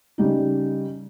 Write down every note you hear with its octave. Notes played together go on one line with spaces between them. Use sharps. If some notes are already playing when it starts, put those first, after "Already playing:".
C#3 G3 D#4